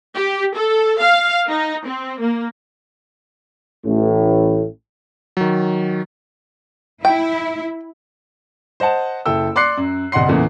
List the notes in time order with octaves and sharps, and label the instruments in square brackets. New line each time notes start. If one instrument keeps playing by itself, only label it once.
[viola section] G4
A4
F5
D#4
C4
A#3
[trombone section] A1 A2
[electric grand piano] D#3 F#3
[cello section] E4 [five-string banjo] G5
[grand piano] C5 D#5 F#5 A5
F#1 E4 A4 G5 E6
D5 C6 D6 F#6 C7 C#7
F#2
G1 C2 D#5 F#5 C6 C7
E2 A#2 C#3 E3 A3